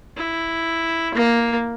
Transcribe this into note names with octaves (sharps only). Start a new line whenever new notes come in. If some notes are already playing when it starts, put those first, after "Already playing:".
E4
A#3